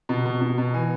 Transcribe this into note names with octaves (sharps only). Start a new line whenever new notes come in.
B2
B2
B2
B2
E3 G#5